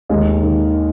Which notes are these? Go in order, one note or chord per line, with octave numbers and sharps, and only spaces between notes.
D#2 D#3 G#3
D#3